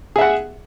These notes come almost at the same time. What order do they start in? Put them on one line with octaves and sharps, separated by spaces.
G#4 E5 F#5